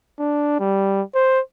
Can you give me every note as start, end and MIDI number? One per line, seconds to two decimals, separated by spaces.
0.19 0.58 62
0.60 1.02 55
1.15 1.40 72